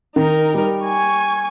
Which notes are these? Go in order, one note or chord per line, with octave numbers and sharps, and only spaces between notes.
D#3 D#4 A#4
G3
G#5 C#6